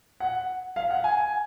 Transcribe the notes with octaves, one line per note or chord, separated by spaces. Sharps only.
F#5
F5
F#5
G#5